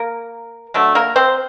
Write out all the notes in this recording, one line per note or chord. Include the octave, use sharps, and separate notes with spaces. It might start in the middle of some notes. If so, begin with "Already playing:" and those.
Already playing: A#3 A#4
D3 F#3 A3
A#3 A#4
C4 C5